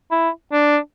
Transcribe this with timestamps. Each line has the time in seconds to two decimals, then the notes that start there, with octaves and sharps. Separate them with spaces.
0.11 E4
0.52 D4